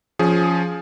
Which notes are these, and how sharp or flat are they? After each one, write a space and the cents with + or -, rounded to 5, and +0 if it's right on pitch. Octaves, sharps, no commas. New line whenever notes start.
F3 +0 C#4 +15 G#4 +10